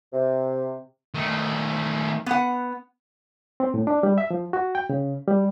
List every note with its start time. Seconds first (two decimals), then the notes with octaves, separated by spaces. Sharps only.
0.13 C3
1.14 D#3 A3
2.26 B3 F#5
3.60 C4
3.74 A2
3.87 D4
4.03 G3
4.18 E5
4.31 F3
4.53 F#4
4.75 G5
4.90 C#3
5.28 G3